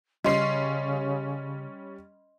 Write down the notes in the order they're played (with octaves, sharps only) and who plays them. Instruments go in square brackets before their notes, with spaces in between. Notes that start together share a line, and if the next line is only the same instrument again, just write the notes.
[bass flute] C#3 [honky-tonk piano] G3 C#4 [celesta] D#5 C6 C7